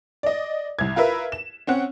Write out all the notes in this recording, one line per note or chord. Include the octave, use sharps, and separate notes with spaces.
D5 D#5
C2 G#6
F4 A#4 B4 E5
E7
C4 C#4 F#5